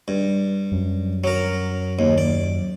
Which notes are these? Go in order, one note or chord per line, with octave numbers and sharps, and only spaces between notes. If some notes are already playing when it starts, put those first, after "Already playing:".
G2
F#2
F#3 A#4
D#2
D5